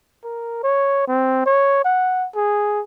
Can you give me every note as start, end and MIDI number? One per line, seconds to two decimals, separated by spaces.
0.24 0.60 70
0.63 1.03 73
1.08 1.41 60
1.46 1.80 73
1.85 2.27 78
2.35 2.82 68